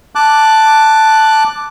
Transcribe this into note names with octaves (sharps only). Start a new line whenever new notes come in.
A5 D6 F#6